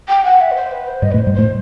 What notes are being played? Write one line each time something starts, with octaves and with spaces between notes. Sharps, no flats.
G5
F#5
E5
B4
C5
B4
C5
G2 G3 D#5
A2 A3 B4
C5
G2 G3
A2 A3 C5